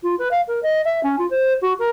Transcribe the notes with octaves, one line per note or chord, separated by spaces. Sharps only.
F4
B4
F5
A#4
D#5
E5
C#4
F4
C5
F#4
A#4